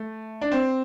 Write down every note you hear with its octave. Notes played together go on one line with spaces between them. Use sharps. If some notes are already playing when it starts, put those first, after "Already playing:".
Already playing: A3
D4
C4